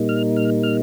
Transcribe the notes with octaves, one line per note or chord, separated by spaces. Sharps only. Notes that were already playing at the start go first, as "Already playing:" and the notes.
Already playing: A#2 G3 A#3 D#4
F6
F6
F6